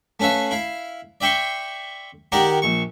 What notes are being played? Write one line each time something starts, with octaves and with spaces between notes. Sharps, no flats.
A3 C#4 B4 E5 F5
E4 F5
D5 E5 G5 C6 C#6
D#3 G4 A#4 D5 F#5
A#1 C#6